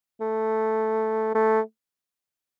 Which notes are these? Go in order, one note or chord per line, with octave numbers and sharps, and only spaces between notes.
A3
A3